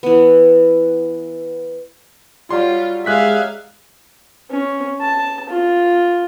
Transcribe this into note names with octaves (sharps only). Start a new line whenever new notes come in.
E3 B3
F#3 G3 F4 C6
G#3 G#4 E5 F5 F#6 B6
C#4
A5
F4